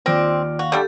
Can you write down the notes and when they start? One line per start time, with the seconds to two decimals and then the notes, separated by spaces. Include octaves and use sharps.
0.06 D#2 C4 F4 D5 D6 A#6
0.59 F#4 F5
0.72 D3 G3 A3 G4 A4